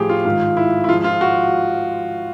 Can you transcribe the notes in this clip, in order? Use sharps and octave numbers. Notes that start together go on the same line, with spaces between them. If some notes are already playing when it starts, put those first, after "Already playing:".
Already playing: A2 F3 G4 G#4
F4
G#2 D#3 F4
E4
E4
G#2 F3 F4
F4
F#4